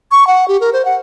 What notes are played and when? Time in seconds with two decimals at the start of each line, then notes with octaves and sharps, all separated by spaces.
0.11 C#6
0.27 F#5
0.48 G4
0.61 A#4
0.73 C5
0.85 F#5